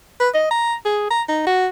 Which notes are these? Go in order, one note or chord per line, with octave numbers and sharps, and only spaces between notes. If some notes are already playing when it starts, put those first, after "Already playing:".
B4
D#5
A#5
G#4
A#5
D#4
F#4